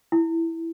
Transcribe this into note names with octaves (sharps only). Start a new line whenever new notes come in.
E4